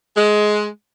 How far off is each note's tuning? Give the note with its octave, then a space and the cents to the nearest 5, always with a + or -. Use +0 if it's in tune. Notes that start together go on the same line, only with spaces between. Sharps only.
G#3 +15